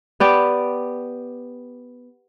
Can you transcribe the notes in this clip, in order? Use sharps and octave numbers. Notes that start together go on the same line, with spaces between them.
B3 G4 D5